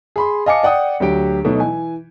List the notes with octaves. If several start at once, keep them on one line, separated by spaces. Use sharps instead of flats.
G#4 B5 C6
D#5 F5 G#5 A5 D6 C#7
D5 F#5 G5 D#6
D2 F#3 G4 D7
B2 F#3 A3 D#4
E3 G#5